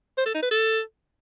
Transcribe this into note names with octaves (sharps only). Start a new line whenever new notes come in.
C5
A4
D#4
B4
A4